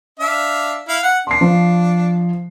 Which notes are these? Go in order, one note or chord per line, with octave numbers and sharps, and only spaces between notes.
D4 E5 F5
E4 F5
F#5
D4 C6 C7
F3